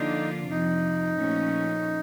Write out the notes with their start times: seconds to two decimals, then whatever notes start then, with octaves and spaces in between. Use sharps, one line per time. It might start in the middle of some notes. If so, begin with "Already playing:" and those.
Already playing: D3 F3 A#3 D4 D#4 F4
0.50 F2 C3 F3 D#4
1.18 A#2 F3 A3 C#4